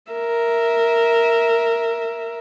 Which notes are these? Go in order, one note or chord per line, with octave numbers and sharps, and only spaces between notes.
A#4 E5